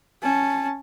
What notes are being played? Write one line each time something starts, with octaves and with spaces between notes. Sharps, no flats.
C#4 A5